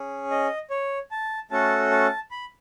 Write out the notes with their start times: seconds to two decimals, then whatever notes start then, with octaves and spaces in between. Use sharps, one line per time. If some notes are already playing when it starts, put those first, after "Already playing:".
Already playing: C#4 G#4
0.31 D#5
0.70 C#5
1.11 A5
1.51 A3 C#4 F#4 A4 A5
1.91 A5
2.31 B5